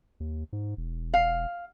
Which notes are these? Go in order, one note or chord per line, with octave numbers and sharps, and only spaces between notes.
D#2
G#2
E1
F5